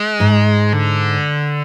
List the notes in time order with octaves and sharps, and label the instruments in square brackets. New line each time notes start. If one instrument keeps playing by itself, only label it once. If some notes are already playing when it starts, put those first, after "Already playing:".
Already playing: [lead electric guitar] G#3
[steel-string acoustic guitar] G#2
[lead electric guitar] D3